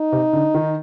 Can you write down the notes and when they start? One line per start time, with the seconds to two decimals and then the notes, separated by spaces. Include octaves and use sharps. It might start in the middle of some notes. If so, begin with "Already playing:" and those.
Already playing: D#4
0.12 C3
0.33 D3
0.54 D#3